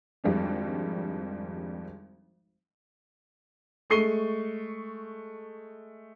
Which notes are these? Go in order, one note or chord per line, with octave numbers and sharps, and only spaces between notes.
G#1 F2 G3 G#3 D4
G#3 A3 C#6 C7 D#7 G7